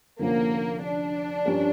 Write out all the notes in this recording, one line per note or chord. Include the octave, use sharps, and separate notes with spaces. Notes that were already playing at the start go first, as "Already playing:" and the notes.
F1 F2 D3 F3 A#3 C#4
D4
G2 F3 C#4 G4 A#4